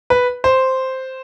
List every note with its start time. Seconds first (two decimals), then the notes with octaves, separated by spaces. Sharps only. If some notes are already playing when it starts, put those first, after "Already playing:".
0.10 B4
0.44 C5